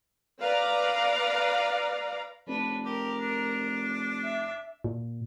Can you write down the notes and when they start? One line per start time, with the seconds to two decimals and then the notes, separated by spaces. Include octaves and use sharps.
0.42 B4 D5 F5 A#5
2.48 F1 D4 B4
2.85 G4 A#4
3.20 D4
4.23 E5
4.84 A#2